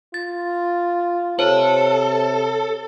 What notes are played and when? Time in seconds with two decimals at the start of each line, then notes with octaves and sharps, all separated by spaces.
0.14 F4 A6
1.39 C3 A4 C5 C#5